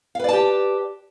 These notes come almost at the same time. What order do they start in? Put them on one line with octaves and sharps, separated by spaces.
F5 B4 D5 A5 G4